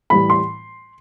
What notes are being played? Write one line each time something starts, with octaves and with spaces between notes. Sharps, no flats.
A2 E3 G3 B5
C6